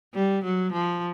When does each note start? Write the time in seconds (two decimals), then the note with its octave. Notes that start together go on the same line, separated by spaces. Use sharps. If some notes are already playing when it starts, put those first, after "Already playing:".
0.14 G3
0.44 F#3
0.72 F3